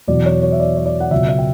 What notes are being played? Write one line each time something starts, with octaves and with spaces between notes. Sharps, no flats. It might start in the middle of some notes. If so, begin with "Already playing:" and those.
E2 B2 F#3 D5
C#5
C#5
E5
D5
C#5
D5
F#5
C#2 B2 F#3 E5
E5
G5